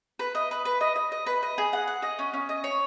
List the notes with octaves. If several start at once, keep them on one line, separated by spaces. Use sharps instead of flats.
B4
D#5
B4
B4
D#5
D#5
D#5
B4
D#5
G#4
F#5
F#5
D#5
C#4
C#4
D#5
C#5